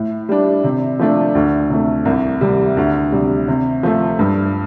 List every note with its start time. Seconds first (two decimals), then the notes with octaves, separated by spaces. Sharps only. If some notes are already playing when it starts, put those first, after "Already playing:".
Already playing: A2
0.29 G3 D4
0.64 C3
0.99 F3 A3 D4
1.35 D2
1.70 C3 A3
2.05 C2
2.41 C3 G3
2.77 D2
3.12 C3 G3
3.48 C3
3.83 F3 A3
4.19 G2